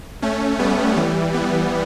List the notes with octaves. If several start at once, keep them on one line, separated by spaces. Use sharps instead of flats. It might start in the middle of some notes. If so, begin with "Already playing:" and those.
A3 C#4
G3 B3
E3 G3
G3 B3